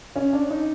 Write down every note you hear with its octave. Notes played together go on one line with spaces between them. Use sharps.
C#4
D4
D#4